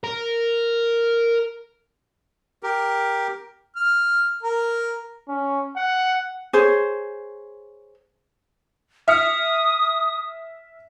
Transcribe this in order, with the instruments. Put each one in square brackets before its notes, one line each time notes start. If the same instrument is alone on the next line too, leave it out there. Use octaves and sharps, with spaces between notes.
[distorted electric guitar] A#4
[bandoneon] G4 A#4
[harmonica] F6
A#4
[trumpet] C#4
F#5
[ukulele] G#4 C5 C#5
[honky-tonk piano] E5 F6 C#7 [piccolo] D#6